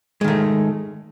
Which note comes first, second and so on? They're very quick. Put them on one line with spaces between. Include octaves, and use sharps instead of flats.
G#3 D#3 A3